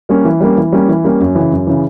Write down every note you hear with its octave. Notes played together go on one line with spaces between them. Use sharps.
G3 A#3 C#4
E3
G3 A#3 C#4
E3
G3 A#3 C#4
E3
G3 A#3 C#4
F#2
C#3 E3
F#2
C#3 E3